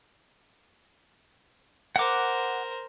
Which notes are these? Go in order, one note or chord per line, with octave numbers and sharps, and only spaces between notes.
A#4 C5 F#5 D6